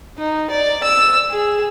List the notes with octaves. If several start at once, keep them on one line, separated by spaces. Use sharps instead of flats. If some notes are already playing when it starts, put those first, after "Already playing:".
D#4
D5
E6
G#4